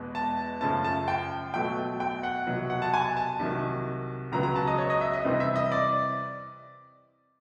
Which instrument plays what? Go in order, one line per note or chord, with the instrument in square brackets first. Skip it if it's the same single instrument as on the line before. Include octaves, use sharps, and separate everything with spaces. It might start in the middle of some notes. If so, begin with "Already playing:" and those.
Already playing: [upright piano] E2 B2 G#3 B3
A5
F#2 C#3 F3 A3 C#4 A5
A5
G5
B2 F#3 A3 G5
G5
F#5
C2 B2 F#3
F#5
A5
G#5
A5
C2 C3 D#3 F#3
C#2 C#3 F#3 B3 A#5
A#5
A5
D#5
C#5
D#5
E5
D#5
C3 E3 G3 C4
E5
D#5
D5